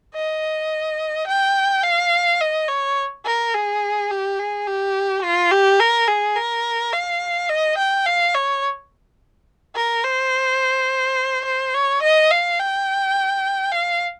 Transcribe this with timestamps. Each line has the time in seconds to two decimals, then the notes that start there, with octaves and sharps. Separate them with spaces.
0.15 D#5
1.27 G5
1.84 F5
2.41 D#5
2.68 C#5
3.25 A#4
3.54 G#4
4.10 G4
4.39 G#4
4.67 G4
5.24 F4
5.51 G4
5.80 A#4
6.08 G#4
6.36 A#4
6.93 F5
7.50 D#5
7.78 G5
8.06 F5
8.35 C#5
9.76 A#4
10.04 C5
11.45 C5
11.74 C#5
12.02 D#5
12.31 F5
12.59 G5
13.72 F5